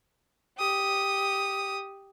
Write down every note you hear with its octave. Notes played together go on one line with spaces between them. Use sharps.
G4 D#6